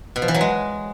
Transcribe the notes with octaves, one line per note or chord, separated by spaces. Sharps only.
B2
F3
E3
F#3
G#3